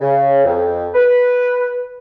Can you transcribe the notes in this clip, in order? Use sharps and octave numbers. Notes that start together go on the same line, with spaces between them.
C#3
F2
B4